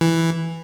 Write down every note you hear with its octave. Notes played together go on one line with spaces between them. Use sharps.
E3